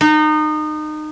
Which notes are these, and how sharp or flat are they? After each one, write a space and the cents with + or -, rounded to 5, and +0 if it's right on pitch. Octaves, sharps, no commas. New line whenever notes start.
D#4 -25